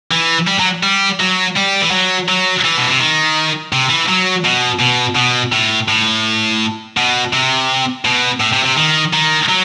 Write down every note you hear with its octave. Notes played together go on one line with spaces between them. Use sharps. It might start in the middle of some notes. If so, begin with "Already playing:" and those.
E3
G3
F#3
G3
F#3
G3
E3
F#3
F#3
E3
B2
C3
D#3
C3
E3
F#3
B2
B2
B2
A2
A2
B2
C3
B2
A2
C3
C3
D#3
D#3
F#3